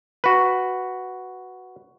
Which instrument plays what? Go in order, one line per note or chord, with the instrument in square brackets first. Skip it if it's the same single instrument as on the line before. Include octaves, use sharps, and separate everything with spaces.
[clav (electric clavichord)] F#4 B4